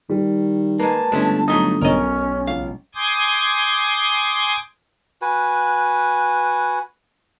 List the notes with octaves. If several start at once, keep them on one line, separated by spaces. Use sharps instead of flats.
D#3 G3
G#3 A#3 B4 A5
G1 G#3 A3 C#4
F#3 A3 D#4 D#6 G7
B1 C#4 A#4 C#5 D#5
C#2 F5
G#5 C6 D6 D#6 G6 G#6
F#4 B4 G#5